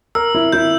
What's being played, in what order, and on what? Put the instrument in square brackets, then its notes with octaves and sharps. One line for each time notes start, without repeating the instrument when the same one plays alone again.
[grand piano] A#4 [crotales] E6
[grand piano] E4
[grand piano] E4 [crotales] G6